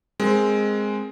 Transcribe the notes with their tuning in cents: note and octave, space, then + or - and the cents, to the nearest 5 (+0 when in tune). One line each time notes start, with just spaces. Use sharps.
G#3 +0 C4 +0 A#4 +0